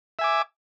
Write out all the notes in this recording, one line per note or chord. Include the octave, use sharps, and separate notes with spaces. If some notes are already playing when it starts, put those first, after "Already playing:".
E5 G#5 D6